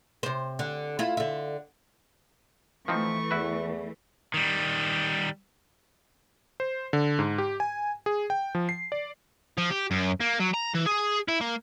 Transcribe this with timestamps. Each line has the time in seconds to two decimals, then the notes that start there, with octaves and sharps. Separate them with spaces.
0.23 C3 C5
0.59 D3
0.99 E4 F4
1.17 D3 E5
2.88 E3 F3 A3 C4 D#4 C#6
3.31 E2 E4 F#4 B4
4.34 D#3 G3
6.60 C5
6.93 D3
7.19 G#2
7.38 G4
7.60 G#5
8.06 G#4
8.30 G5
8.55 F3
8.69 C7
8.92 D5
9.58 F3
9.71 G4
9.91 F#2
10.20 A#3
10.39 F#3
10.54 A#5
10.74 E3
10.86 G#4
11.28 E4
11.41 A#3